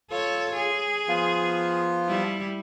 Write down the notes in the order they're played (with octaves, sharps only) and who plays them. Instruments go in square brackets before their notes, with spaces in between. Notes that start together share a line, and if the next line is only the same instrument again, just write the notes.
[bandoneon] F4 [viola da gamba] A4 C#5
[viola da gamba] G#4
[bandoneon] F3 B3 F4
[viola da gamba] G3 E4